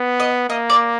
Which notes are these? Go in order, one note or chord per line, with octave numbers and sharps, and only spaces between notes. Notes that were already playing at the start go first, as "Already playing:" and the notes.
Already playing: B3
D#5
A#3 D#5
D5